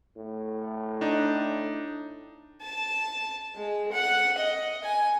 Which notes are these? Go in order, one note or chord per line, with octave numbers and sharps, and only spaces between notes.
A2
D4 D#4
A5
G#3
F#5
D#5
G#5